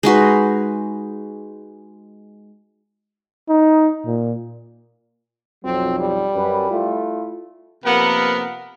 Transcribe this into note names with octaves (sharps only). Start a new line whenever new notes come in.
G#3 D#4 F#4 B4
D#4
A#2
B1 F2 F#3 C4
G3
F#2 B4
A3 E4 F4
C3 F3 A#3 B3 A#4 F#5